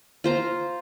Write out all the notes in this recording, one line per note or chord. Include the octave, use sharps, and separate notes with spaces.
F4 C5 A#5